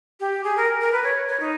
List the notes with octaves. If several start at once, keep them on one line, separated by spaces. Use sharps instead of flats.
G4
G#4
A#4
A#4
B4
C#5
C#5
D#4